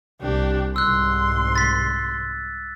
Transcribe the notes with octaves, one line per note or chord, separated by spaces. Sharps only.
C2 D4 G4
C2 G#2 C6 E6 F#6
A6 B6